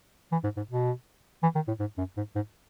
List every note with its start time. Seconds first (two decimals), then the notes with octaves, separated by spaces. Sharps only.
0.32 E3
0.43 G#2
0.57 G#2
0.69 B2
1.43 E3
1.55 D#3
1.68 A2
1.79 G#2
1.98 F#2
2.17 G#2
2.35 G#2